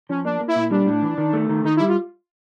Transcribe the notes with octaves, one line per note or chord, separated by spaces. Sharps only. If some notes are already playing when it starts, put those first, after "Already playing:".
F3 C#4
A#3 D4
A#3
E4
A#2
G3 D4
A2
E3
D#3
A3
D#3
D#3 D#4
E4
G3
F4